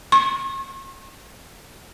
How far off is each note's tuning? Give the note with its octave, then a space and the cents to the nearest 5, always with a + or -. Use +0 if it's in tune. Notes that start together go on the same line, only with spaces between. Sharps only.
C#6 -45